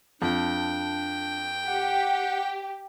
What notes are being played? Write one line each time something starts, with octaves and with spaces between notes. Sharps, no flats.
F2 D4 G5
G4 F#5